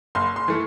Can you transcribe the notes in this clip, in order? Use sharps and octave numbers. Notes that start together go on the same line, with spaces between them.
F#1 C6
C6
E3 A3